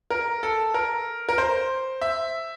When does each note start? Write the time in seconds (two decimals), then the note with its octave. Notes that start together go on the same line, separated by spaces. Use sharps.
0.10 A#4
0.43 A4
0.74 A#4
1.29 A#4
1.38 C5
2.01 E5